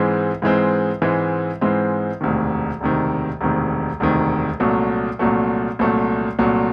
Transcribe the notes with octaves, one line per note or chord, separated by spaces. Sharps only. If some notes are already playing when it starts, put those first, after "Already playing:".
Already playing: G#2 E3 G#3 C4
G#2 E3 G#3 C4
G#2 E3 G#3 C4
G#2 E3 G#3 C4
E1 D2 C3 D#3
E1 D2 C3 D#3
E1 D2 C3 D#3
E1 D2 C3 D#3
C2 A#2 F#3 A3
C2 A#2 F#3 A3
C2 A#2 F#3 A3
C2 A#2 F#3 A3